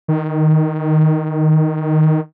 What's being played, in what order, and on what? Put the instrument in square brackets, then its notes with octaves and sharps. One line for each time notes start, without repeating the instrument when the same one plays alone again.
[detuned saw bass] D#3